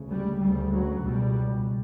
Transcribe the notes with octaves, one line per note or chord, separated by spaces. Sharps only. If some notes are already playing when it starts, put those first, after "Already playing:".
Already playing: D2 C#3
G3
D2 C#3 G3
F#3
C#2 B2 G3